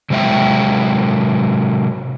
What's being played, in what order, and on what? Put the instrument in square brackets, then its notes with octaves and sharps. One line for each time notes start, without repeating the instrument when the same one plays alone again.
[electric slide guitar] C3 F#3 G#3 E5 G5